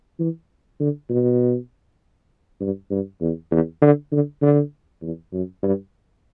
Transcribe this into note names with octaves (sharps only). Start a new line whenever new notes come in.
E3
D3
B2
G2
G2
E2
E2
D3
D3
D3
E2
F#2
G2